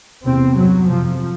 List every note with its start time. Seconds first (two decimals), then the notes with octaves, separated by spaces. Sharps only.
0.24 E2 C3 C4
0.56 G2 F#3
0.88 F2 C3 F3